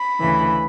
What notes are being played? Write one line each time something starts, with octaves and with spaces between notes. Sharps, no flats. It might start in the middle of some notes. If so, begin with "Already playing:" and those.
Already playing: B5
D2 C#3 E3